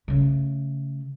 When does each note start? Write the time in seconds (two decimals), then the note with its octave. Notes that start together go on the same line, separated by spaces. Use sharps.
0.08 C#3 A3